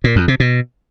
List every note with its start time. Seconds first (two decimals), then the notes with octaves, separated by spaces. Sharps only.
0.04 A#2
0.16 F2
0.28 C3
0.40 B2